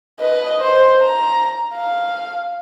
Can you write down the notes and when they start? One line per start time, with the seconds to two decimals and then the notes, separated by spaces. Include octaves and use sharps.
0.21 B4 D#5
0.60 C5
1.01 A#5
1.75 F5